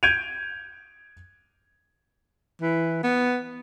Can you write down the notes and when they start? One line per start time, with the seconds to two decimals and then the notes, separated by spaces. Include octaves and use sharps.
0.03 G6 G#6 D7 D#7 F7
2.61 E3
3.03 B3